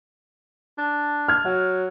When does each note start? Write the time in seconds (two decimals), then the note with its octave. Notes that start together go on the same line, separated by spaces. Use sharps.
0.78 D4
1.28 F6 G#6
1.45 F#3 F#5